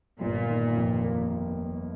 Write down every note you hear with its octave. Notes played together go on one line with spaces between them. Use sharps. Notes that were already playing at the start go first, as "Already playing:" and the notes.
G1 A#2
D#3
F2
A#3